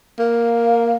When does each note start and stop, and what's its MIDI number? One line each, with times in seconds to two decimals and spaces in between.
0.19 0.97 58
0.19 0.96 77